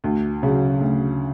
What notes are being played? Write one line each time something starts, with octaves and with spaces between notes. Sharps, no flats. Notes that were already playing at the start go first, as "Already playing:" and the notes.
D2
C#3 F#3
D2